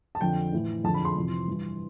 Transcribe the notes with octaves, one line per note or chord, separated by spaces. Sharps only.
A5
F2 D3 G5
A2 E3
F2 D3 A5
B5
C6
F2 C3 E3
G2 E3